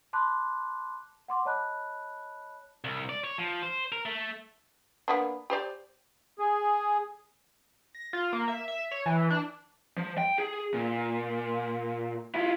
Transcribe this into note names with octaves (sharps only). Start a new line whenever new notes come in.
A5 B5 C6 D6 F#6
F#5 C6 D6
C#5 D#5 A5 B5 F#6
C2
D5
C#5
F3
C5
A#4
A3
A#3 B3 D4
G4 C5 D5
G#4
A#6
F4
A#3
E5
E5
C#5
E3
D4
F3
G5
G#4
A#2
E4 F4